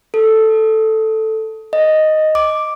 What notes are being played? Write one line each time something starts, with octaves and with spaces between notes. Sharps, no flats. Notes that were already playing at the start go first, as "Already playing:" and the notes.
A4
D#5
D6